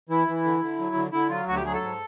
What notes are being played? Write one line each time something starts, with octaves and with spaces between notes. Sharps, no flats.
E3 E4
E3
D3
D3
F#3
D3
D3 E4
F#3 F4
D2 F#4
G4
F#3 G#4
A4
G#2